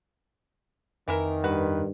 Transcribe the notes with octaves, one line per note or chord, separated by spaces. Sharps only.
F2 D#3 E3 E4 A#4
G2 F#4 B4